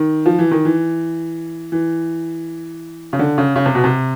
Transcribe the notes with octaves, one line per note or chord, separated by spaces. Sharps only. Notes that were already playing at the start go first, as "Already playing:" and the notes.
Already playing: D#3
F3
E3
D#3
E3
E3
C#3
D3
C#3
C#3
C3
B2
C3